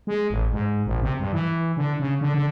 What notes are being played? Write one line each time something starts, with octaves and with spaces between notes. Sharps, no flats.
G#3
A1
G#2
A#1
C3
G2
E3
D3
C#3
D3
D3